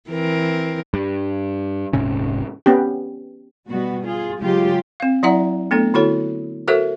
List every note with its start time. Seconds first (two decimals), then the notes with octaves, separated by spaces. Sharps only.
0.10 E3 C4 A#4
0.94 G2
1.93 D#1 G#2 C3 C#4
2.66 B3 C#4 G4
3.69 B2 G3 B3 F#4
4.07 F4 G#4
4.40 C#3 F#3 G#3 F4 G4
5.00 C4 F5
5.23 F#3 E4 D5 E5 F#5 A#5
5.71 A3 B3 D4 A4
5.94 D3 E4 F#4 A4 C#5
6.68 F#4 A4 A#4 C5 E5